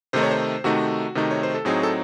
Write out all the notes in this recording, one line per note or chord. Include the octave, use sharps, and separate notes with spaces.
C3 D#3 A3 D#4 C5
C#5
C5
C3 D#3 A3 D#4 F#4
C3 D#3 A3 D#4
C#5
C5
A4
A2 F#3 C4 D#4 G#4
A4